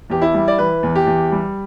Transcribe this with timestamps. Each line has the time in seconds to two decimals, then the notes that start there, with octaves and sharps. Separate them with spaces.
0.10 E2 G4
0.22 E4
0.34 G3
0.48 D5
0.58 E3 B4
0.83 E2
0.96 G4
1.07 E2
1.32 G3